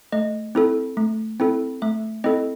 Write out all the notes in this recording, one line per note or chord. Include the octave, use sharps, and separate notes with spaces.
A3 D#5
C4 E4 A4
A3
C4 E4 A4
A3 E5
C4 E4 A4 D#5